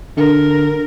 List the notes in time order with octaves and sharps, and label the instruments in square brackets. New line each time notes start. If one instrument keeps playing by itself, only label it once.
[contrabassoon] D3 [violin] A#4